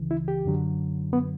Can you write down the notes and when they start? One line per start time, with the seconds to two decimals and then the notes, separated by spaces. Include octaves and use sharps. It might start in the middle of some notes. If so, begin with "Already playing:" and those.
Already playing: C#2 C#3 E3
0.11 E4
0.28 G4
0.45 F#2 D3 F#3
1.13 B3